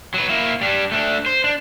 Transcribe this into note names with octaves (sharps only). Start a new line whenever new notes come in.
F#3 B4
A#3 E4
G3 D4
A3 D4
C5
D4